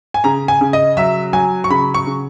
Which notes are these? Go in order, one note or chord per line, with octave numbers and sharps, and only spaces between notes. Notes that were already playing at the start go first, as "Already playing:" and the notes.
G#5
C#3 A#5
G#5
C#3
D#5
F#3 E5
F#3 G#5
C#6
C#3 B5
C#6
C#3